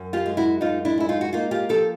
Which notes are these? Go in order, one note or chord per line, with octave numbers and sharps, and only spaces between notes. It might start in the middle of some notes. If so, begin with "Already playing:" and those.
Already playing: F#2
F4 G4
G#3
E4 F#4
F#2 D#4 F4
D4 E4
G#3 E4
D#4 F4
F#4
A#3 D#4 F4
F4 G4
F3 G4 A4